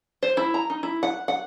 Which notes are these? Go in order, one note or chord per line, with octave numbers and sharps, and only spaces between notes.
C5
E4
A#5
D#4
E4
F#5
F#5